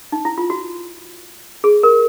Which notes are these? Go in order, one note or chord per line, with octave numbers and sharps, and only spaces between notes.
D#4
E4
F4
F#4
G#4
A#4